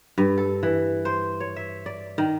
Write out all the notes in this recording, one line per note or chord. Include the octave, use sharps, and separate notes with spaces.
G2
A4
E3
C5
C#5
E5
D5
D#3